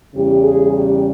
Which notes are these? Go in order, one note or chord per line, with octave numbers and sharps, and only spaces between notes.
E2 C#3 G3 G4
G#4
G4